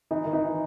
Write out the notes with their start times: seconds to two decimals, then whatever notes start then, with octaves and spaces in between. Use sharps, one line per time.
0.11 E3 D#4
0.25 D#3
0.33 E3 D#4